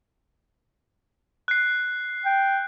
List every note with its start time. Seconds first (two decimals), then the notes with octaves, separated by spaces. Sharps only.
1.48 F#6 C7
2.25 G5